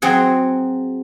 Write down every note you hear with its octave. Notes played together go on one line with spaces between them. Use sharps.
F#3 C4 G#4 F#5